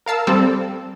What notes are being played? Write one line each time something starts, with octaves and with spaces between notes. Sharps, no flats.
A#4 F5 A5 E6
G3 C4 A4